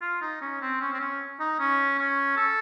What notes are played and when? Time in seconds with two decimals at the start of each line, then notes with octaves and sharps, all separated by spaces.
0.02 F4
0.22 D#4
0.42 C#4
0.62 C4
0.81 C#4
0.93 C4
1.00 C#4
1.40 D#4
1.60 C#4
1.99 C#4
2.37 A4